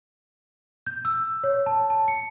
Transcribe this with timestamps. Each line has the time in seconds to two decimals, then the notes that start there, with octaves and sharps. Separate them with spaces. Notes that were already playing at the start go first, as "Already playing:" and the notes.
0.86 G6
1.05 E6
1.44 C#5
1.66 A5
1.90 A5
2.08 C#7